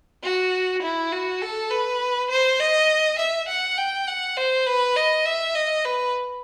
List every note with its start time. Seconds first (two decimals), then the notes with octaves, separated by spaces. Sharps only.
0.23 F#4
0.82 E4
1.12 F#4
1.41 A4
1.71 B4
2.30 C5
2.60 D#5
3.19 E5
3.48 F#5
3.78 G5
4.07 F#5
4.37 C5
4.66 B4
4.96 D#5
5.26 E5
5.55 D#5
5.85 B4